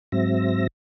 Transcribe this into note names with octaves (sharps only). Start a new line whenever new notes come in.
G#2 F#3 C4 E5 A#6